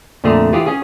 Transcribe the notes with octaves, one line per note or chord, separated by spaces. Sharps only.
F2 A#2 D3 A3 G#4 A#5
E3 F4 G4 G#4
C#4 G#4